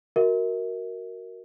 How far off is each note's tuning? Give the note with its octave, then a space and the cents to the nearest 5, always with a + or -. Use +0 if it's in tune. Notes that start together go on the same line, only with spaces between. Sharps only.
F#4 +0 A#4 +0 E5 -40